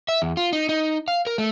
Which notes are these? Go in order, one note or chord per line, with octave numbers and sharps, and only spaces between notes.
E5
E2
F4
D#4
D#4
F5
A#4
A3